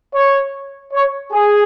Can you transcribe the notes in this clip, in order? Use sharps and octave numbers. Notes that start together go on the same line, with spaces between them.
C#5
C#5
G#4